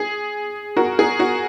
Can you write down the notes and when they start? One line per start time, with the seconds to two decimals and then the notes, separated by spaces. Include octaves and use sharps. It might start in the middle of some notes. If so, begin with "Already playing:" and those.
Already playing: G#4
0.77 F#4 A#4
0.99 G#4
1.20 F#4